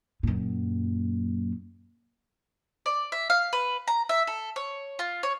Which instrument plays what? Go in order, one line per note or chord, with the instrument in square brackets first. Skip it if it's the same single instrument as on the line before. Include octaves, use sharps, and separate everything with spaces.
[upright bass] F#2 A#2
[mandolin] D5
E5
F5
B4
A#5
E5
A4
C#5
F4
C#5